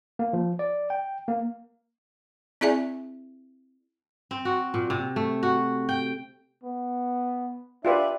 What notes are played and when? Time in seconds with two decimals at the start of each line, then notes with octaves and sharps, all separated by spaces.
0.19 A#3
0.33 F3
0.59 D5
0.90 G5
1.28 A#3
2.61 C4 E4 G#4 D5 E5 G#5
4.31 C4
4.45 F#4
4.74 A#2
4.90 C3
5.16 A3
5.43 F#4
5.89 G5
6.63 B3
7.85 D4 F4 G4 B4 D5 E5